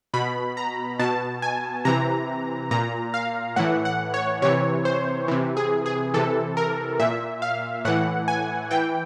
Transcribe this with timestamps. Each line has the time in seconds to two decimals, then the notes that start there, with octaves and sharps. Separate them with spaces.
0.14 B2 B5
0.57 A#5
0.99 B2 A5
1.42 G#5
1.85 C3 E3 A#5
2.71 A#2 A#5
3.14 F5
3.56 A2 E3 F#5
3.85 F#5
4.14 C#5
4.42 C3 E3 C#5
4.85 C5
5.28 C3 E3
5.57 G#4
5.86 G#4
6.14 C3 E3 A4
6.57 A#4
7.00 A#2 E5
7.42 F5
7.85 A2 E3 F#5
8.28 G#5
8.71 E3 G5